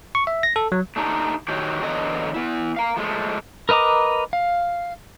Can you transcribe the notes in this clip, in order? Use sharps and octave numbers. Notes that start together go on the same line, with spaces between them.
C#6
E5
A#6
A4
F#3
A3 D4 D#4 G4
D#3 F#4 G4 C#5
E2 D3 F#3 D#5
B3 E4
F5 A#5
F3 G#3 A3
A#4 B4 D#5 A#5 D6
F5